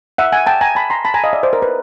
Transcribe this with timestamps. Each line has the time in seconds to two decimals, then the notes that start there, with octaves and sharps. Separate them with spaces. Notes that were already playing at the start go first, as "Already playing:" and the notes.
0.18 E5 F#5
0.32 F#5 G#5
0.47 G5 A5
0.61 G#5 A#5
0.75 A5 B5
0.90 A#5 C6
1.05 A5 B5
1.14 G#5 A#5
1.24 D#5 F5
1.33 D5 E5
1.43 C5 D5
1.53 A#4
1.62 B4